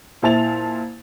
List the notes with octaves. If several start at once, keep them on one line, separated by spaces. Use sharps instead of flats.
A#2 E4 C5 A5 A6 F7